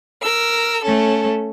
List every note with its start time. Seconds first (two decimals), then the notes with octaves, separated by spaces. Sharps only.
0.23 A#4 E6
0.83 A3 C#4 A4